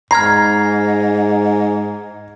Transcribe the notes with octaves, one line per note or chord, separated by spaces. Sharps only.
G#2 A#5 F6 G#6 C7